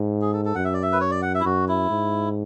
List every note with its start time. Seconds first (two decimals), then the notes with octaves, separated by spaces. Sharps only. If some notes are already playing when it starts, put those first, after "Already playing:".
Already playing: G#2
0.21 G#4
0.33 A4
0.45 A4
0.55 F#2 F#5
0.65 E5
0.74 D5
0.83 E5
0.92 B4
1.01 C#5
1.11 D5
1.22 F#5
1.35 E5
1.40 E4
1.45 F#2 F#4
1.68 E4
1.90 G#2